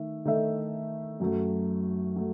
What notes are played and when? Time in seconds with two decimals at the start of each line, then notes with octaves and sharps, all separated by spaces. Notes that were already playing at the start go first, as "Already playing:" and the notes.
Already playing: D#3 A3 D#4 E5
0.25 D#3 A3 D#4 A4 E5
1.20 F#2 F#3 A3
2.16 F#3 A3